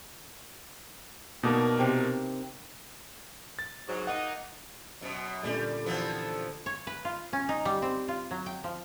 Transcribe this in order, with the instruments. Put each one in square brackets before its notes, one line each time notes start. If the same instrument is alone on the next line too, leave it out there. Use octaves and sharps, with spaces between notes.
[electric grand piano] B2 A#4 [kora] A#3 D4 D#4
[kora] C3 C4
[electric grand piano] A6
[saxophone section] G#2 F#3
[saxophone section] A#3 D#4 [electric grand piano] F#5
[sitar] F#2 B2
[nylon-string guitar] A#2 D3 C#4 [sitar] G3
[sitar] E3 F3 B3 [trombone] A4
[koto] C#5
B4
F4
C#4
D#4
G3
C4
F4
F#3
G5
F3